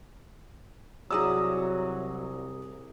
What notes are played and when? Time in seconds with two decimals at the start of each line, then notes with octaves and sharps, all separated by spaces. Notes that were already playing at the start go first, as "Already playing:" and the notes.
1.11 C2 F#3 E4 G#4 D5 A#5 D#6 E6